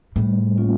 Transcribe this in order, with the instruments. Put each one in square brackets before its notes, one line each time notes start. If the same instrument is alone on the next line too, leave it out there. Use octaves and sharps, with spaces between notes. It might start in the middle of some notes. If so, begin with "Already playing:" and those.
[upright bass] A2 [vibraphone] G3
[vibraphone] A#3 C#4 F4